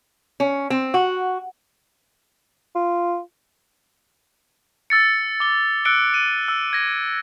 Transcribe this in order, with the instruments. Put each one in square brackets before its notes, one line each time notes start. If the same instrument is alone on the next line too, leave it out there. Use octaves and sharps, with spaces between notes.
[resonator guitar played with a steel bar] C#4
C4
F#4
[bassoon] F4
[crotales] E6 A6 C#7
D6 G7
E6 F#6 C#7 D7 G7
D#7
E6
G#6 A#6